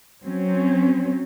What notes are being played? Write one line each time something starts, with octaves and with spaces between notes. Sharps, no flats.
F#3 C4 C#4